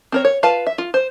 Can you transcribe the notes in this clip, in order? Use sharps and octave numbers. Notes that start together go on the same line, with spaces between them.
C4 A#4 C#5
C#5
F4 B4 F5 A5
E5
F4
C5